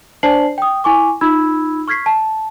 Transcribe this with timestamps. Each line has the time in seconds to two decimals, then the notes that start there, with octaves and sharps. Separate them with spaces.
0.23 D4 C5 D5 A5 C7 F#7
0.58 G5 D#6
0.84 E4 G#5 C#6 D6
1.21 D#4 F4 B5 E6 G#6
1.88 C#6 F6 G#6 B6 C7
2.06 A5